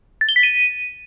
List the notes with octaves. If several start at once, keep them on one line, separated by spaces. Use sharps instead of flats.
A6
G7
B6
D#7